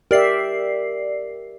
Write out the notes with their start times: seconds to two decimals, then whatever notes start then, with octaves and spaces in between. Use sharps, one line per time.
0.11 G4 A#4 D5 E5 C7